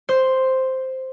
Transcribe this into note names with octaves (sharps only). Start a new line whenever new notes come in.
C5